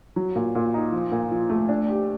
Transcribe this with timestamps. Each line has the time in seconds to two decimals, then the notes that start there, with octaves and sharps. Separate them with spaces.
0.16 F#3
0.36 A#2
0.55 A#2
0.74 D#4
0.92 F3
1.12 A#2
1.31 F3
1.49 A3
1.69 D4
1.89 G4